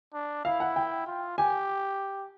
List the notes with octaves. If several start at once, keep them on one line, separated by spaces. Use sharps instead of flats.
D4
E4 F5
F#5
G5
F4
G4 G#5